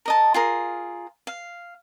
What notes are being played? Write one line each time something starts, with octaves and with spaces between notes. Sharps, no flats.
A#4 D#5 A5
F4 G#4 A#4
F5